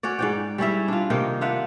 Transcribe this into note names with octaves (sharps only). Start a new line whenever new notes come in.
C#4 F#4 C#5 D5
G#2 D5 G5
G3 C#4 E4 E5
D4 F4
C3 D#3 A#3 G5
D4 F4 E5 F#5